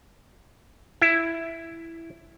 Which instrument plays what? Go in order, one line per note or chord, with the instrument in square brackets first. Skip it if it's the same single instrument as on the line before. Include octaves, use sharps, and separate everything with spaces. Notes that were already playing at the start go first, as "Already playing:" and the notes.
[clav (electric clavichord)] E4